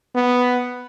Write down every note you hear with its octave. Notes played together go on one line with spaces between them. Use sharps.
B3